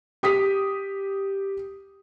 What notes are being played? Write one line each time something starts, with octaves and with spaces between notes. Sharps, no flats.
G4 D#6 B6